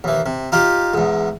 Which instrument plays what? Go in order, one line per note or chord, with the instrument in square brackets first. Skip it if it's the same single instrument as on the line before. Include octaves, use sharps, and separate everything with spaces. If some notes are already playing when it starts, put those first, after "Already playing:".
[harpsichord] D#2 E3
C3
D#4 F4 G4
E2 G#2